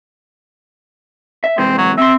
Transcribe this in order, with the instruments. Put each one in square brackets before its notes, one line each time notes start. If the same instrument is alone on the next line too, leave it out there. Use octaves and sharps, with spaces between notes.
[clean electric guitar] E5
[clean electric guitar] C3 E3 G#3 [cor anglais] C4
[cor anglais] F#3
[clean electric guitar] C4 C6 [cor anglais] E5